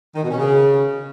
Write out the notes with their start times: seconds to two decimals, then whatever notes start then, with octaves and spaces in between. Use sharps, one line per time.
0.15 D#3
0.23 B2
0.30 C#4
0.38 C#3